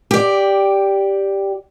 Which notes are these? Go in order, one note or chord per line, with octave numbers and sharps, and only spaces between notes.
G4 D5